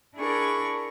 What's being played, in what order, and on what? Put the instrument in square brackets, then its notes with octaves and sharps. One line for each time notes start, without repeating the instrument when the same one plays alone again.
[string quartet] D4 E4 G#4 A#4 C#6